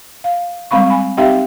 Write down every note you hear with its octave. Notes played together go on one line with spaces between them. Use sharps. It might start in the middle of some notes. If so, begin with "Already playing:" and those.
F5
G3 G#3 C4 F5 B5 C#6
G#5 B5
C4 D#4 G4 E5 F5 G5